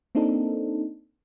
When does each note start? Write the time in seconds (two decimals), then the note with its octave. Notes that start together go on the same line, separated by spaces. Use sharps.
0.15 A#3 C4 D4 D#4 A4